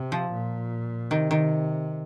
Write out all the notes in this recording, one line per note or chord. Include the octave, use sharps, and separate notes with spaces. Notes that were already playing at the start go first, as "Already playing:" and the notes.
Already playing: C3
F3
A#2
C3 D#3
D#3